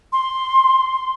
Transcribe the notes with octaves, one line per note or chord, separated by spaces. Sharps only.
C6